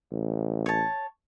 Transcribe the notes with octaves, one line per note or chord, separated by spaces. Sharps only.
A1
C#5 A5